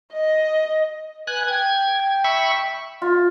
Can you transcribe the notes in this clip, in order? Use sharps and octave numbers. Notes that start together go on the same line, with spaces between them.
D#5
B4 G#5 F#6
G5 G#6
E5 B5 C#6
F4